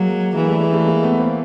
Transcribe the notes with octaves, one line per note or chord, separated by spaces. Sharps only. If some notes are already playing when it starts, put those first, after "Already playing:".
Already playing: F#3 G#3 A#3
E3 G#3 A#3
G3 A3
G#3
G3 A3
G#3 A#3
A3 B3
A#3 C4